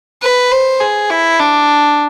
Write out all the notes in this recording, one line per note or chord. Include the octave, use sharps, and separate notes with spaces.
B4
C5
G#4
E4
D4